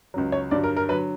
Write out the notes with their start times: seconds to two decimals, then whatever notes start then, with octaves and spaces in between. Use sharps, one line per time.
0.14 C#2 C#3 F#3
0.32 C#5
0.51 G2 D3 F#3 D5
0.64 A#4
0.77 A#4
0.89 D3 F#3 B4